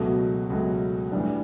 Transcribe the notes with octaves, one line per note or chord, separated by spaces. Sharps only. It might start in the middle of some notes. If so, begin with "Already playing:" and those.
Already playing: C#2 B2 F#3 A3
C#2 B2 F#3 A3
A2 E3 G3 D4